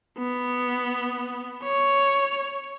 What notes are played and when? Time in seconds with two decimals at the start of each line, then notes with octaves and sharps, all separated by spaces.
0.18 B3
1.64 C#5